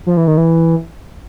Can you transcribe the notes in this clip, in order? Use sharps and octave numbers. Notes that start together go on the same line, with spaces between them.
F3
E3
D#3
E3